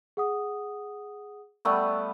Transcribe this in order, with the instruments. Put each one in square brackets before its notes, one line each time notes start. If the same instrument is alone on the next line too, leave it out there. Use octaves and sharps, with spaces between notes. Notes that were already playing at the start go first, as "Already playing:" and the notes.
[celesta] G#4 F#5 D#6
[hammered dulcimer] G3 A3 B3 [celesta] C#6 E6